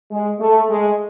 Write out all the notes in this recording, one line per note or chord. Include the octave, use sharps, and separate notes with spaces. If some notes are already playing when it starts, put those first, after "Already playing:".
G#3
A3
G#3